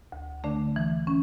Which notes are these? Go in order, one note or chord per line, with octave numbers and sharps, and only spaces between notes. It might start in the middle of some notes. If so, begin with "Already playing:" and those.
D2
D3 A3 D4
E3
C#4